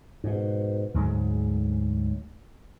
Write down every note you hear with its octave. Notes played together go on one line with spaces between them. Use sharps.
G#2 B2
D2 G#2 F#3 G#3